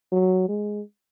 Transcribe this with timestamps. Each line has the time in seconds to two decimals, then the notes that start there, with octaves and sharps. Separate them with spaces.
0.12 F#3
0.48 G#3